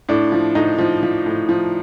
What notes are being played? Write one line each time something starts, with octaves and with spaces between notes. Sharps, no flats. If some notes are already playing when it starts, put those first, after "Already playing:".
A2 D4
F3
A2 D#4
F3
F3
A2
F3